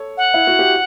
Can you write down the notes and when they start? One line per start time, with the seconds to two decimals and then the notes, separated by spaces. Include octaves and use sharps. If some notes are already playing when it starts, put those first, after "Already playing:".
Already playing: A4 C#5
0.17 F#5
0.34 E4
0.47 F#4
0.59 G4